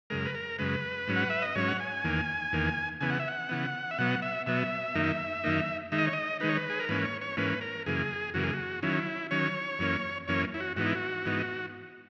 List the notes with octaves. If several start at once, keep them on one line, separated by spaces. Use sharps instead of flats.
F#2 C#3 G#3 A#4
B4
A#4
F#2 C#3 G#3 B4
G#2 F#3 C#4
F#5
E5
D#5
G#2 F#3 C#4 C#5
F#5
G#5
E2 D#3 A#3
E2 D#3 A#3
C#3 E3 B3 G#5
F#5
E5
F#5
C#3 E3 B3
E5
B2 F#3 B3 F#5
E5
B2 F#3 B3 E5
F#2 D#3 A#3 D#4
F#2 D#3 A#3 D#4
D#3 G#3 D#4 E5
D#5
C#5
D#5
D#3 G#3 D#4 B4
C#5
B4
G#4
A#4
G#2 E3 A#3 C#4 B4
C#5
C#5
G#2 E3 A#3 C#4 B4
A#4
F#2 C#3 E3 A#3 G#4
F#2 C#3 E3 A#3 F#4
G#4
F#4
D#3 F#3 C#4 E4
D#3 F#3 C#4 C#5
F#2 E3 A#3 C#4
F#2 E3 A#3 C#4 C#5
E4
F#4
G#2 E3 B3 D#4 F#4
E4
F#4
G#2 E3 B3 D#4